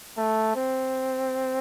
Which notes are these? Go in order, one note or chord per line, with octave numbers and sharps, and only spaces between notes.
A3
C4